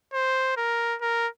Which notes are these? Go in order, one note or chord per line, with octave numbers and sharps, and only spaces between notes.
C5
A#4
A#4